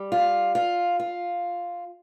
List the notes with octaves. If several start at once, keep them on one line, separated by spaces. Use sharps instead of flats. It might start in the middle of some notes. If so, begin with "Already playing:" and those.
Already playing: G3
F4
F4
F4